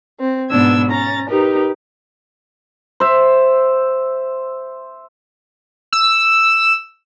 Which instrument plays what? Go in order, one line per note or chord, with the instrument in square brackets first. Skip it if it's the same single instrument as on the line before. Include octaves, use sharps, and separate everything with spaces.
[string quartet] C4
G#2 B2 B3 D4 E6 G#6
C#4 A#5 A6
D#4 G4 A#4 B4
[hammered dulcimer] C5 E5
[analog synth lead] E6